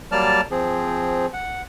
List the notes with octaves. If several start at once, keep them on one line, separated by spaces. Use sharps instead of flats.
F#3 G3 A#3 D5 A5 F6
F3 C4 G#4
F#5